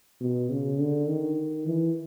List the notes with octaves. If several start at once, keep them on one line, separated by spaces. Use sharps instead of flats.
B2
C#3
D3
D#3
E3